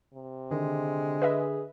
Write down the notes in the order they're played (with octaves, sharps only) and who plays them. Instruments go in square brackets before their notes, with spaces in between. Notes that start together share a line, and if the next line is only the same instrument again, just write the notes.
[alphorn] C3
[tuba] D3 [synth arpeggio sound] D#3 [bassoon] G#3
[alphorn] G#4 [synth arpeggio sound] B4 D#5 E5